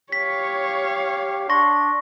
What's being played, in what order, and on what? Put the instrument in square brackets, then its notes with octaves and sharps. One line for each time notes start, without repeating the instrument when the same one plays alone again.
[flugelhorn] G4 [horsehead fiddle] C#5 F5 [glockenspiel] B6
[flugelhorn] D4 [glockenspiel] C6 C#6 A#6